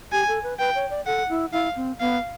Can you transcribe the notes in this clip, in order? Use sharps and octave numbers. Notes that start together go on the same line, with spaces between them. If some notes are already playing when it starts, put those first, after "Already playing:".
G4 G#5
A4
B4
B4 G5
C#5
D5
A4 F#5
E4
E4 F5
C4
B3 F5